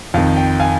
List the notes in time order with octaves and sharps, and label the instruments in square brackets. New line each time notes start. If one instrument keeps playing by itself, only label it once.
[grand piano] F2 D#3 F5
G5
F5 G#5